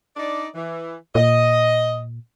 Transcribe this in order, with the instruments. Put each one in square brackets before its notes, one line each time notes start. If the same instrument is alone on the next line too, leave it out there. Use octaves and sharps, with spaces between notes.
[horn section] D4 D#4 D5
E3
[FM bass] A#2 [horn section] D#5